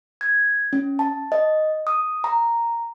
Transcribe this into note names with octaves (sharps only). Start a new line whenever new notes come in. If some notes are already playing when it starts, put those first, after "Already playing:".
G#6
C#4
A5
D#5
D#6
A#5